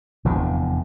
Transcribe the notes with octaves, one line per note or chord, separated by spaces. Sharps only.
F1 E2 A2 D3